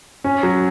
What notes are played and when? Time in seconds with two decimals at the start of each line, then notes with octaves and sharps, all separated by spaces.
0.24 C#4
0.43 F#3